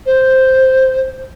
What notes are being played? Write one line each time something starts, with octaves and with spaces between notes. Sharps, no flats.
C5